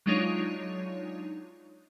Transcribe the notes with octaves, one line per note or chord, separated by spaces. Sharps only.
F#3 G#3 D4 D#4 F4 C#5